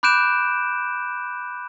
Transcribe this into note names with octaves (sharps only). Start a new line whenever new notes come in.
B5 D6 F#6 G6 D7 E7